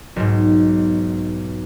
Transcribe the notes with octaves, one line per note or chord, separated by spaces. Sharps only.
B1 G#2